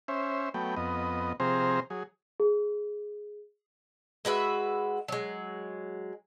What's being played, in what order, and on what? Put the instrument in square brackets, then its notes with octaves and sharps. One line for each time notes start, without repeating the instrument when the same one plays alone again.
[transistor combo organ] C#4 C5 E5
F#3 A3 B3 G5
F2 B3 D#5
C3 F3 C4 G#4 C5 A#5
F#3 G#4
[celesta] G#4
[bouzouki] G#3 F#4 B4 E5
F#3 G#3